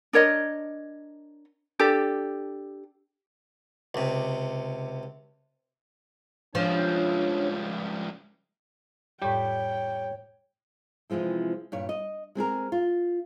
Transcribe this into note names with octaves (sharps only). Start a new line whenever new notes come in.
D4 A#4 C#5 D#5
D4 G4 A4
C#2 C3
C#2 F3 G3 D4 C#5
F2 A2 G3 G4 C#5 G5
C3 E3 F3 G#3 C4
G2 A#2 C#5
D#5
G#3 C4 G#4 A#4
F4